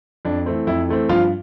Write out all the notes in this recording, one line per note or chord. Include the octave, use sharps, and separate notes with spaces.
F2 D4
E3 A3 C4
F2 E4
E3 A3 C4
G2 F3 F4